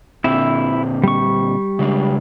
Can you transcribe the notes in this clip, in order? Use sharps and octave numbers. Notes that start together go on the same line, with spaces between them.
A#2 D3 C4 E4 E5
G3 C#6
C#3 G#3 D4